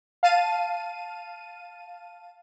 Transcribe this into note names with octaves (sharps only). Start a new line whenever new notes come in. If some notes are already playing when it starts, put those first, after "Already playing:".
F5 A5 D#7